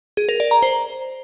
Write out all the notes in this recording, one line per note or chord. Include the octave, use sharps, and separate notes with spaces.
G#4
A#4
D5
A#5
C5